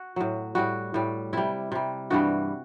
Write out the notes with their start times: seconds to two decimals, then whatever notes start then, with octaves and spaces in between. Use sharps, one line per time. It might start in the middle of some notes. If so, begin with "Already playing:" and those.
Already playing: F#4
0.16 A2 F#3
0.55 A2 G3 F#4
0.94 A2 G3
1.33 C3 G3 E4
1.72 C3 G3
2.10 G2 E3 G3 F#4